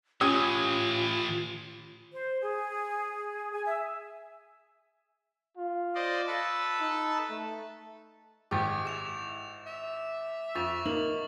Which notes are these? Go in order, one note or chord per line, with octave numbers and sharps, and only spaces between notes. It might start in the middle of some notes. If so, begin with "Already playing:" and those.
A2 E3 C#4 F4 G4 D#6
C5
G#4
G#5
E5
F4
C5 D5 D#5
A4 B4 A5
D#4
A3
G#1 G4 G#4 D6 A6
E4 D6 E7 F7
E5
F2 C#6 A6 F7
A#3 D#4 F#7